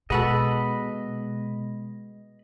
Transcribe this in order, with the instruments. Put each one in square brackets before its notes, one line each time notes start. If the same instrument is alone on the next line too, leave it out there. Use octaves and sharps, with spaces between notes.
[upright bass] B2 [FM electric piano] G#3 [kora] B3 F#4 A4 [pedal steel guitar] D#5 B5